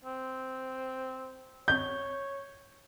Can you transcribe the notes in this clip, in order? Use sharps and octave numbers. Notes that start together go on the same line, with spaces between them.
C4
C#5 G6